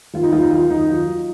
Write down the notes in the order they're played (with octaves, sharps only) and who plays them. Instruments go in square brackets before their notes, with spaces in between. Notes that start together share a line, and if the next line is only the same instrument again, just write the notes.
[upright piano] D#2 F4
D#4
D#2 F4
D#4
F#3 F4
D#2 D#4
F#3 F4
F#3